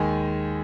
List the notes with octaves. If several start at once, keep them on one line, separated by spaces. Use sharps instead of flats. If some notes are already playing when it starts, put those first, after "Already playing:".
Already playing: D#2 D#3 G#3 G#5